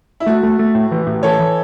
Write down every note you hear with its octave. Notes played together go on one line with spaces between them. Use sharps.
E4
A3 F#4
A3
A3
A2
E3
A2
E3 A4 C#5
E3